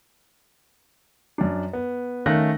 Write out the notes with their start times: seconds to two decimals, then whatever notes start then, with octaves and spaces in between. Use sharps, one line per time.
1.38 F#2 D4
1.73 B3
2.26 D#3 A3 C#4 F5 F#6 A#6